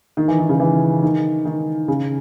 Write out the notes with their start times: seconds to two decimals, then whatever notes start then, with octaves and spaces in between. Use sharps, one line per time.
0.17 D#3
0.28 E3
0.39 D#3
0.49 C#3
0.60 E3
1.03 D#3
1.45 D#3
1.88 C#3